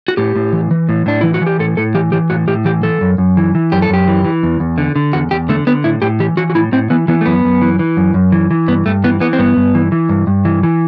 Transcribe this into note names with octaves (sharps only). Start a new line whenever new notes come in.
F#4
A2 G4
A2
E3
E3
A2
A2 D4
E3 E4
F#4
E3 G4
A2 A4
A2 A4
E3 G4
E3 G4
A2 F#4
A2 G4
E3 G4
E3 A4
F#2
F#2
E3
E3
F#2 G4
A4
F#2 G4
E3
E3
E2
E2
D3
D3
E2 F#4
E2 G4
D3 A3
D3 B3
A2 E4
A2 G4
E3 G4
E3 F#4
F#4
A2 E4
A2 C4
E3 B3
E3 B3
A3
F#2 B3
F#2
E3
E3
F#2
F#2
E3
E3
G2 B3
G2 A3
E3 B3
E3 B3
C4
G2 B3
G2
E3
E3
G2
G2
E3
E3